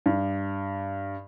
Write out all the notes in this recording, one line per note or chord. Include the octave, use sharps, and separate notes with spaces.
G2